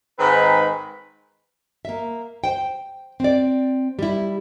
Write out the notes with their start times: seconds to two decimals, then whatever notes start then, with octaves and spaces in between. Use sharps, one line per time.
0.19 G#2 D#3 G#3 C4 B4 B5
1.85 A#3 E5
2.44 C5 G5
3.20 C4 D5
3.99 G3 E4